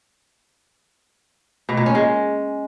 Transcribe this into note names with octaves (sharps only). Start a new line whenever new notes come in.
B2
A#2
C#4
G#3